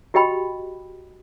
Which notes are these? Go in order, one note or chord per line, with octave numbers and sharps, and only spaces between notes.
F#4 G4 D#5 G5 B5